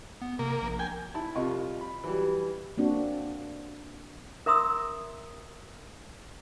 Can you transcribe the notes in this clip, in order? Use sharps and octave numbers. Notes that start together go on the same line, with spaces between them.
B3
C3 A#3
A#1
G5 G#5
E4 A5 B5
C2 F2 G3 F4 D#5 C#6
B5
E3 F#3 G3
A#3 C4 D4 F#4
A#4 E5 A#5 C6 D#6 E6